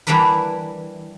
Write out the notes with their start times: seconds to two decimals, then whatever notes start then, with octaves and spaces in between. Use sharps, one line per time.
0.07 E3 G3 A#3 D4 A#4 B4